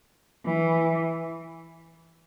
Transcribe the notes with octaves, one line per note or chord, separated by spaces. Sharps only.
E3